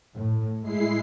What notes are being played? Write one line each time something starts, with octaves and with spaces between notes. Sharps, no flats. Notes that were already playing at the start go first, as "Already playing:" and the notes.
A2
G#3 E4 C7